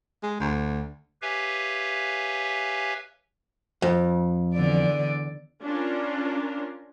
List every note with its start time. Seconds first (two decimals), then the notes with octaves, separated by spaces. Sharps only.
0.23 G#3
0.40 D2
1.22 G4 B4 C#5 E5 F5 G#5
3.82 F2
4.55 E2 D3 D5
5.63 C#4 D4 F4 A#4